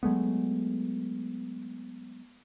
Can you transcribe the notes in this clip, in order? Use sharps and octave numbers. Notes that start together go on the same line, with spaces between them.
F#3 G#3 A3 B3